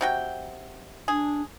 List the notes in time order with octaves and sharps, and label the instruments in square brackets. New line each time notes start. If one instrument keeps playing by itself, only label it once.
[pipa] C3 F#4 G5
[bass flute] D4 [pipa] G#4